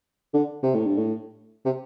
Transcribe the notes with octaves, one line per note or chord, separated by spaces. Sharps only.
D3
C3
A2
G2
A2
C3